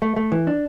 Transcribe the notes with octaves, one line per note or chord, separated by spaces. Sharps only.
A3
A3
E3
D4